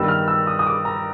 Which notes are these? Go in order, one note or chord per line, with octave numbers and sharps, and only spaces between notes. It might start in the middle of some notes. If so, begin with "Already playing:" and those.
Already playing: G2 D#3 G3 B3 E6
F6
E6
D#6
D#6
D6
A#5